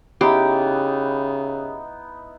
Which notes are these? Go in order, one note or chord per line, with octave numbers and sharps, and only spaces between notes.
C#3 B3 D#4 E4 G4